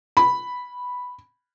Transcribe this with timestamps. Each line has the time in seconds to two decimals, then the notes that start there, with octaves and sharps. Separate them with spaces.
0.17 B5